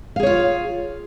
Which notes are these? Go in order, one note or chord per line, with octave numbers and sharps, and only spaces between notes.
F4 G#4 C#5 F5